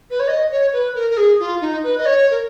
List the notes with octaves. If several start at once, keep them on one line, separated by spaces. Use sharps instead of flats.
B4
C#5
D#5
C#5
B4
A#4
A#4
G#4
F4
D#4
B4
D#5
C#5
A#4